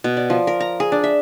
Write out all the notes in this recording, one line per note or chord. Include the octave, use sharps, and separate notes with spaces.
B2
D5
F3
A#4
A#5
G#4
D4
E5